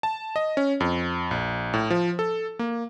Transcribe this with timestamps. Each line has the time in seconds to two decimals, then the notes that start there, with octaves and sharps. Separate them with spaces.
0.03 A5
0.36 D#5
0.57 C#4
0.80 F2
1.31 A#1
1.74 A2
1.90 F3
2.19 A4
2.59 A#3